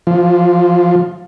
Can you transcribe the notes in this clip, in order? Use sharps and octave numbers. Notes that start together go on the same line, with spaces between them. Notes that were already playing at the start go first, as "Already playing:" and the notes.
F3